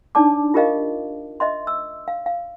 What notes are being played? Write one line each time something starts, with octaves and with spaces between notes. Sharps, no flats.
D4 D#4 C#5 D5 A5 D6
F4 G4 A#4 D#5 F5
D#5 E5 C6
E6
F5
F5